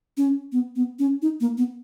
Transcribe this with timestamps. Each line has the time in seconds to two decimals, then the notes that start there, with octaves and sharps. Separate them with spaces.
0.17 C#4
0.52 B3
0.76 B3
0.99 C#4
1.22 D#4
1.41 A#3
1.58 B3